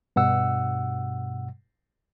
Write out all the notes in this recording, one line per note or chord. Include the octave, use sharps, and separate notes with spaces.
G2 B2 F#5 E6